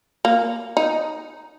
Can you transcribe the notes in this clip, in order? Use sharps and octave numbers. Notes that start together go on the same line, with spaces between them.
A#3
D#4